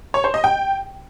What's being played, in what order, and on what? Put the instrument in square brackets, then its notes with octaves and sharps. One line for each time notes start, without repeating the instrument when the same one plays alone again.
[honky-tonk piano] C#5
C5
D#5
G5